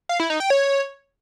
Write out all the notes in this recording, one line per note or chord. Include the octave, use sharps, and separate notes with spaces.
F5
E4
D#4
G5
C#5